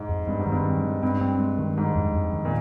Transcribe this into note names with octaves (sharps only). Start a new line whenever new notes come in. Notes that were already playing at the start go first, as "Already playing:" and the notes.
Already playing: G#2
F2
G2 G#3
G#2
D#3
G2
C4
G#3
G2 C4
C4
G#3
D#3
G#2 G#3
F2
F2
D#3
A#2